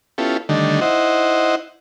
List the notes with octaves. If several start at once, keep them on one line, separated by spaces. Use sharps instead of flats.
B3 C#4 E4 F4 G4 A4
D3 D#3 G3 A3 D4 D#4
D#4 E4 C5 D#5 F#5